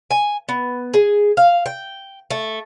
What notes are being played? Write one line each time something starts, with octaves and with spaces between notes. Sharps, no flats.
G#5
B3
G#4
F5
G5
A3